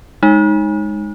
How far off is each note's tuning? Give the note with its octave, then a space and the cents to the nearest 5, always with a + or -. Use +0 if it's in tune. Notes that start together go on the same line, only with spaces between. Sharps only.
G#3 +0 D#4 +0